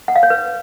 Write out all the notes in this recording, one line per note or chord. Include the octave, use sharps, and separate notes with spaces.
F#5
F5
C#5
B4